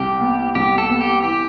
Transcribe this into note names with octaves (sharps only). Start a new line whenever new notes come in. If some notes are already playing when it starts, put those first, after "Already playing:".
Already playing: C2 G4
B3
C2 G4
A4
B3
G4
E3 G4